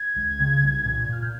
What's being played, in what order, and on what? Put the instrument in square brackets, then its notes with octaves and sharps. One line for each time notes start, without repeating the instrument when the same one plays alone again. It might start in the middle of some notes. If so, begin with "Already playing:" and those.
Already playing: [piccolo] G#6
[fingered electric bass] C#2
C#3
C2
A#2
[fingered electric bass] A#2 [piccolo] F6
[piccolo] G6